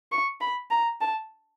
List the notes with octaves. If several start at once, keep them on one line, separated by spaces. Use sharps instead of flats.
C#6
B5
A#5
A5